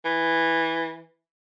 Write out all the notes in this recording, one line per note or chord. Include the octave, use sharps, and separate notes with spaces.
E3